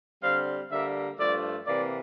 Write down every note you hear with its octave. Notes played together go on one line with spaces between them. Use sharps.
D3 G3 C4 F5
D3 G3 A#3 E5
G2 F3 A3 D5
C3 E3 A#3 D5